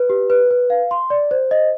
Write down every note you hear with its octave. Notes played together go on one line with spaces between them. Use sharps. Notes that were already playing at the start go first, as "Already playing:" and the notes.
Already playing: B4
G4
B4
B4
F5
C6
D5
C5
D#5